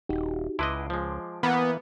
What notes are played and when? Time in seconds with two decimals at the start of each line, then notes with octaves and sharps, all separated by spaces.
0.09 D#1 D#4 F#4 G4
0.59 C#2 E4 B4 D#5 A5 C6 D6
0.90 F3 G#3
1.43 E3 A#3 B3